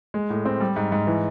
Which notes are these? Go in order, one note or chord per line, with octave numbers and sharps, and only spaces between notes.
G#3
A2
C4
G3
G#2
G#2
E3